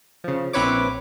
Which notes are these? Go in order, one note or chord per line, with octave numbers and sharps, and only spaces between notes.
C#3 F3
A#1 C4 E4 B4 C#5 D6